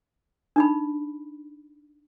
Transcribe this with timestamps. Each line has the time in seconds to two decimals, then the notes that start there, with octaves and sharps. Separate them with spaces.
0.56 D4 D#4 B5